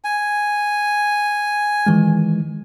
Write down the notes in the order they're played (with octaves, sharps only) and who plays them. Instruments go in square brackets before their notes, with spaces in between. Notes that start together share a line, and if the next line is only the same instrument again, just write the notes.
[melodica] G#5
[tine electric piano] D#3 E3 G#3